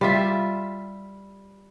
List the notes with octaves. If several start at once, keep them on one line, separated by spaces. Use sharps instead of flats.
G3 F4 E5